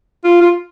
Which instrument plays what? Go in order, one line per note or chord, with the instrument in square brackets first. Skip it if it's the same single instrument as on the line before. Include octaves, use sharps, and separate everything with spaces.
[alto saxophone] F4
F4